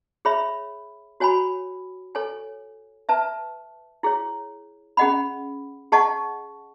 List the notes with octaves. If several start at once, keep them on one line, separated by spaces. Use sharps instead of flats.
G#4 C#5 E5 B5
F#4 C#5 G#5 B5
A4 C#5 G#5
B4 E5 A5
E4 G#4 C#5
C#4 G#4 D#5 F#5 B5
G#4 D#5 F#5 A5 C#6